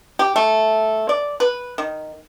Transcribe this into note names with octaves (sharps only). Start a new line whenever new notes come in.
G4
A3
D5
B4
D#3